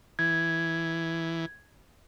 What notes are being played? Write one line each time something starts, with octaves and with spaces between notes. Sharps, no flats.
E3 G#6